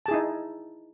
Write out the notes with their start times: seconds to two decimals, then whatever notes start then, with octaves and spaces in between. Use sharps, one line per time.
0.06 A5
0.08 G#4
0.11 E4
0.14 D#4